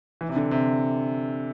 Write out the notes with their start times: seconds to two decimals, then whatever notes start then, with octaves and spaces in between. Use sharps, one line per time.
0.21 E3
0.29 C3
0.36 D3
0.51 C3